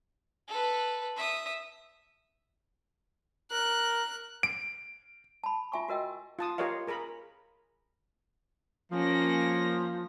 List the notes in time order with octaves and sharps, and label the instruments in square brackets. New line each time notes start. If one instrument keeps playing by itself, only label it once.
[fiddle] A4 B4
E5 D#6
[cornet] A#4 [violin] F#6
[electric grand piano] D7
[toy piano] A5 B5
F4 E5 G#5 C6 C#6
F#4 A#4 D#5 G5 E6
[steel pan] F4 A5 D#6
F4 G4 A#4 C#5 D#5 F5
G#4 A#4 A#5 B5
[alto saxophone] F3 [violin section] A#3 C#4 A#6